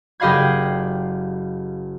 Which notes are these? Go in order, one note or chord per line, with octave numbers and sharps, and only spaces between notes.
F#1 G4 D#5 F5 B5 G#6